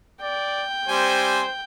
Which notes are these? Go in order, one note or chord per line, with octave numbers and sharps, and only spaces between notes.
D5 G5
G3 C4 C5 G#5